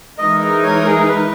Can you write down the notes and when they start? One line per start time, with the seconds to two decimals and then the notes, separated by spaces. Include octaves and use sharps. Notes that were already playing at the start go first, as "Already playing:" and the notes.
0.18 E3 G#3 D#4 A#4 D#5
0.40 D#5
0.63 C#5
0.86 G#4
1.08 B4